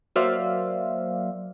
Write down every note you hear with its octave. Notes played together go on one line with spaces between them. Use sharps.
F#3 A#3 C5 D5 E5 F5